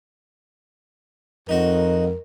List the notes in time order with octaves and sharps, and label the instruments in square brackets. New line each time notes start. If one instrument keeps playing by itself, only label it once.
[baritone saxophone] F2 [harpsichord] D#4 F#4 [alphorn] A#4